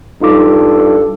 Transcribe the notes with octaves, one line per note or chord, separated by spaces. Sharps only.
G2 D#4 F4 A4 D6